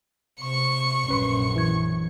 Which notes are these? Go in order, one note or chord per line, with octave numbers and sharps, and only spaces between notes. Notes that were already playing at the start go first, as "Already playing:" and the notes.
C3 C#6
A#1 F#2 C#4 B4 C6
E3 G#6